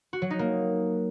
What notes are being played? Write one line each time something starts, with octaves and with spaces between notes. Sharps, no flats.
F#4
F#3
D#4
A#3